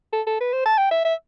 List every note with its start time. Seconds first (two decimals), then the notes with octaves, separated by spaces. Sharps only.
0.13 A4
0.27 A4
0.41 B4
0.53 C5
0.66 A5
0.78 G5
0.91 E5
1.05 E5